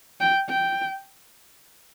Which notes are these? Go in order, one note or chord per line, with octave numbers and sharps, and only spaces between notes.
G5
G5